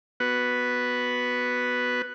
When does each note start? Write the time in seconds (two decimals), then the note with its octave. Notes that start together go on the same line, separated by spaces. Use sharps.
0.20 B3 F#4 B4